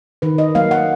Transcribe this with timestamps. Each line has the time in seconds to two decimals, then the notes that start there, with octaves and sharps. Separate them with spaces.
0.22 D#3 B4
0.38 D#5
0.55 F#3 A#3 F5
0.71 F#5